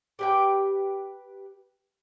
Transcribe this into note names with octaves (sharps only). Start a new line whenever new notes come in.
G4 B4 G5